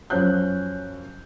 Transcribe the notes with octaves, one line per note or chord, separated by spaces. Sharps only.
F#2 F3 C#4 C5 F#6 G6